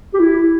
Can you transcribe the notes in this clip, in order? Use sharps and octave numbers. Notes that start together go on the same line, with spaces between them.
G4
E4